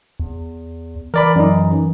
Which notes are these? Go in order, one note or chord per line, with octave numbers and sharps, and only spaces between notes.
E2
E3 A#4 D5 B5
F#2 D#4